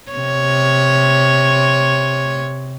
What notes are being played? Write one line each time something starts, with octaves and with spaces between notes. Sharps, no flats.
C3 C#5